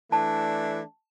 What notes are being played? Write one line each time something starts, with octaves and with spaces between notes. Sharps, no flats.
E3 A3 D4 A5